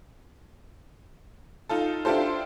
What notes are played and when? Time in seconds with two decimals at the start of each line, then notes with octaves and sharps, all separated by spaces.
1.69 D#4 F4 A4
2.05 D4 E4 F4 G4 A4 C5